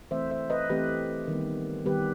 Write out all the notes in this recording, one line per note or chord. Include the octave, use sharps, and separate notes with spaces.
E3 A3 C4 C5 E5
C5 E5
B4 D#5
E3 A3 C4 G4 B4
D#3 G3 B3
D#3 G3 B3 G4 B4